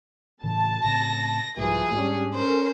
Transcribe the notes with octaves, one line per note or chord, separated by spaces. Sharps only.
A2 C#3 E3 A5
A2 C#3 C4 A#6
C2 G#2 E3 F3 G3 G#4
G#2 G3 C#4 D4
C#4 A4 A#4 C5